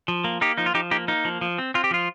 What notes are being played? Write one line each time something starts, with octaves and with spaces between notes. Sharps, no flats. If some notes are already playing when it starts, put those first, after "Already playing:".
F3
A#3
A#3 D#4 G4
F3 D#4
F4
F3 D#4 G4
A#3 D#4 G4
A#3 D#4
F3
F3
C4
C4 F4
G4
F3 F4